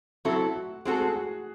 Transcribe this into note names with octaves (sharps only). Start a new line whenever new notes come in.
F#3 C4 E4 F#4 A4
F#4
G#3 C4 F#4 G#4 A4
G#4
F#4